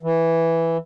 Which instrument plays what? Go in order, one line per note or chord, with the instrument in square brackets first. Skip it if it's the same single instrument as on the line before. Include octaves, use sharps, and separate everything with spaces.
[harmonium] E3